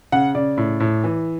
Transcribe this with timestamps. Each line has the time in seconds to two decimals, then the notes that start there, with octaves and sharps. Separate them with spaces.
0.12 C#3 F#5
0.35 C#3 D5
0.57 A2
0.80 A2
1.04 E3